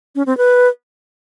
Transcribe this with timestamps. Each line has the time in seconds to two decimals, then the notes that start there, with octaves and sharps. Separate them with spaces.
0.15 C#4
0.26 C4
0.38 B4